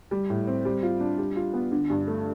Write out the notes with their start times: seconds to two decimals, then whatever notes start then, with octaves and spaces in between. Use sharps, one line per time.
0.11 G3
0.30 A2
0.47 C4
0.65 G3
0.83 F4
1.00 D4
1.18 G3
1.36 F4
1.54 B3
1.72 D3
1.90 G2
2.07 A3